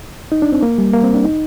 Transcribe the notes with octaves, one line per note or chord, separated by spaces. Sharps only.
D#4
D4
C4
A#3
G3
A#3
C4
D4
D#4